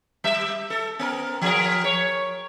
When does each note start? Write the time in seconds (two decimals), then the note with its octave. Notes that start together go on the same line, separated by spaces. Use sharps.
0.24 G3 E5
0.70 A4
0.99 B3 A#4
1.42 F3 G#4 A#4
1.84 C#5